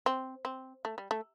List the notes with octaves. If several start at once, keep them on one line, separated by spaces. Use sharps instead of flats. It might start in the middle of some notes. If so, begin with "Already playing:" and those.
C4
C4
A3
G3
A3